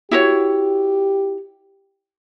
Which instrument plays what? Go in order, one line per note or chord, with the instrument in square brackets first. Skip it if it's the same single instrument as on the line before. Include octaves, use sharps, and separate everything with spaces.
[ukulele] E4 F#4 C#5 [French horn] G4